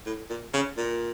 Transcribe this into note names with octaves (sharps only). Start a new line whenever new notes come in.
A2
A#2
C#3
A#2